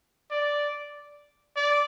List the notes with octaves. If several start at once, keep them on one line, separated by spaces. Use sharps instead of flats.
D5
D5